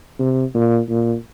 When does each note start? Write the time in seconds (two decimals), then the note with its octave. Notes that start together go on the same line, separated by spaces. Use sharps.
0.20 C3
0.55 A#2
0.90 A#2